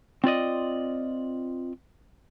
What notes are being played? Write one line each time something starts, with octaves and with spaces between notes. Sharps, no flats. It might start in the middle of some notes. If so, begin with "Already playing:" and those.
C4 F4 D5 D#5